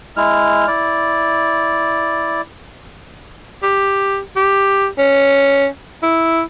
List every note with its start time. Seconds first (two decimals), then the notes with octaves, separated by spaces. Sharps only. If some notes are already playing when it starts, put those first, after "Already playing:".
0.17 G#3 E4 F6
0.67 E4 D5
3.63 G4
4.36 G4
4.98 C#4
6.02 E4